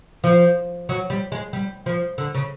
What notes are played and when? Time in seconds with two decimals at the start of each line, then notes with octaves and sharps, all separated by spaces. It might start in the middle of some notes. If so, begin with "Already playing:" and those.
0.24 F3
0.89 F#3
1.10 G3
1.32 G#3
1.53 G3
1.86 F3
2.18 D3
2.35 C#3